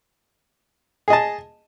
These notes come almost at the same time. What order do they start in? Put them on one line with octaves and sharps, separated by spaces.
G#4 D#5 A5